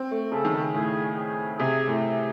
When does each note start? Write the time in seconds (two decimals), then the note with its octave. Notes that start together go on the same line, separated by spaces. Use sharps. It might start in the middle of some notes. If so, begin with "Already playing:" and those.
Already playing: C4
0.11 A3
0.32 C#3 A4
0.45 D#3
0.54 C#3
0.74 A2 G#4
1.17 G#4
1.58 C3 G#4
1.88 A2
2.02 G#4